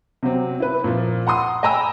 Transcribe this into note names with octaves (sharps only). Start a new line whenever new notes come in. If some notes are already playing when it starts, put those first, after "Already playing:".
C3 F#3 C4
E4 B4
A#2 F3
F#5 A#5 C6 D#6
D#5 G5 G#5 A#5 B5 E6